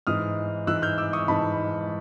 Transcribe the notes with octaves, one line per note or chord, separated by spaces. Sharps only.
G#2 E3 G#3 D#6 F6
G#2 E3 G#3 E6 F#6
F6 G6
D6 E6
C#6 D#6
G#2 E3 G#3 A5 B5